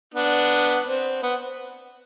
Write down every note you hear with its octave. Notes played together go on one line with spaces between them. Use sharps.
B3 D4
C4
B3